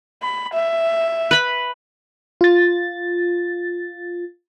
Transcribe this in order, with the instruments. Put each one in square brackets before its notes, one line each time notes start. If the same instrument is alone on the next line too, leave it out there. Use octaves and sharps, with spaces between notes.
[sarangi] B5
E5
[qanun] B4 B5
[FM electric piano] F4 A6